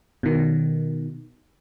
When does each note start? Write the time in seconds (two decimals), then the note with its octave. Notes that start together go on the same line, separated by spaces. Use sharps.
0.23 B2 D#3